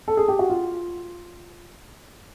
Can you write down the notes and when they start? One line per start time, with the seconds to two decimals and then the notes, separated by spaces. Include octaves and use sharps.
0.08 A4
0.17 G#4
0.28 G4
0.39 F#4
0.50 F4